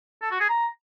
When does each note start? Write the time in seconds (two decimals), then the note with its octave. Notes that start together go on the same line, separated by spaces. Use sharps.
0.22 A4
0.31 F#4
0.40 G#4
0.50 A#5